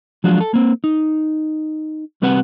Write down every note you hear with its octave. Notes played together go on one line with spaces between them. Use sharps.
F3 F#3 G#3 D4 F4 F#4
A4
A#3 C4
D#4
C2 G3 C4 B4 F#5